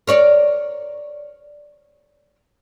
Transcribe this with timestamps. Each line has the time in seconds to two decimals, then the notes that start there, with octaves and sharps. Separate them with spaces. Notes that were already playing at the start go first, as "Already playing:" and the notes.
0.07 A#4 C#5 D5